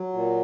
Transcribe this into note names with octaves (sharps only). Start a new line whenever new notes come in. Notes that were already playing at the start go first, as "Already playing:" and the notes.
Already playing: F#3
A#2